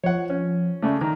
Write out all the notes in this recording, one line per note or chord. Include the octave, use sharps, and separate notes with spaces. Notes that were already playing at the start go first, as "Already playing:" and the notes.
F3 C#5 F#5
C#4
C#3 A3 D5
D#3 A#5